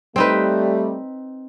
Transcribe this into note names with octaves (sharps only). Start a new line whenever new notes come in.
G3 A3 C4 D#4 B4